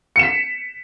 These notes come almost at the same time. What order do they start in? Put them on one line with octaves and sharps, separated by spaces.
C#7 E7 B6